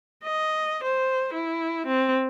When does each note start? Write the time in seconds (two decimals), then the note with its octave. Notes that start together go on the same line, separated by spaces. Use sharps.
0.25 D#5
0.84 C5
1.34 E4
1.86 C4